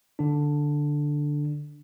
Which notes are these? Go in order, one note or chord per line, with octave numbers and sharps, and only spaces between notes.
D3 D4